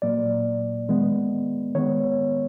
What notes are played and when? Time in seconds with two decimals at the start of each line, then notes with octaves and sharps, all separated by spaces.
0.02 A#2 F#3 A#3 D5
0.89 D#3 G#3 B3
1.75 D#3 G#3 B3 C#5